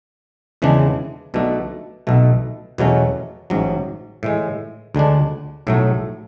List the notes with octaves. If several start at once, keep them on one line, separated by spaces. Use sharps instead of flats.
E2 C#3 E3 G#3 D4
B1 B2 A3 D4
B1 B2 A3
E2 B2 F#3 A3 C#4
A1 G#2 F#3
A2 E3 G#3
D2 D3 G#3 D4
B1 A2 F#3 A3